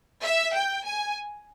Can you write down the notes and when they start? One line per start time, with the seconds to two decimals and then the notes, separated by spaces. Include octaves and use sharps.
0.23 E5
0.54 G5
0.84 G#5